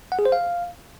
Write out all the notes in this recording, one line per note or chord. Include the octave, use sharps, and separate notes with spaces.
F#5
G#4
C5
F5